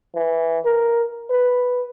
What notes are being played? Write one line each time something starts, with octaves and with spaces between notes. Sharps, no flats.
E3
A#4
B4